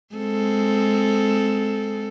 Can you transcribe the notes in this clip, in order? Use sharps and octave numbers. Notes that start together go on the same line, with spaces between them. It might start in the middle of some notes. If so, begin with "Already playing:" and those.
G#3 C4 A4